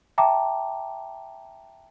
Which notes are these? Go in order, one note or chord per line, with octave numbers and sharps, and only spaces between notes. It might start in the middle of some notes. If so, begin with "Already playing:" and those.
E5 G5 A5 A#5 D6